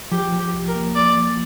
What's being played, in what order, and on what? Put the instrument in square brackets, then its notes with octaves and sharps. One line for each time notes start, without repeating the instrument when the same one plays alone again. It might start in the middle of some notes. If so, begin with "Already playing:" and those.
[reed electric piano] F3 [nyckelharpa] G4
[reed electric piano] F3
[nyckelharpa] G4
[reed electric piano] C2
[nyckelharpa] A#4
[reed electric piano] A#3
[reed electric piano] A#3 [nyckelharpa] D5
[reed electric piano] F3